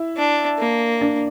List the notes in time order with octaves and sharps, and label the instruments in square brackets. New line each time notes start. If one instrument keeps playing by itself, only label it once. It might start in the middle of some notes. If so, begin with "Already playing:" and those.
Already playing: [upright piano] E4 E5
[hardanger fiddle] D4
A#3
[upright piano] D4 D5